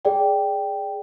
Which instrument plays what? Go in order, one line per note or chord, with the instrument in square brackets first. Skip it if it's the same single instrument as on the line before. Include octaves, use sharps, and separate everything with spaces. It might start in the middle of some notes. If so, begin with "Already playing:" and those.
[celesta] G#4 D5 G5